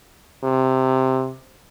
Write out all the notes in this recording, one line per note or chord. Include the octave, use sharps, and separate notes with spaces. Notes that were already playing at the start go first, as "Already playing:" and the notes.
C3